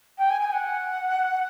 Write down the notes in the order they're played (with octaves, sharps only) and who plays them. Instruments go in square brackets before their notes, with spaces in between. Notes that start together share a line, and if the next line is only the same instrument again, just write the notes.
[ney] G5
G#5
G#5
F#5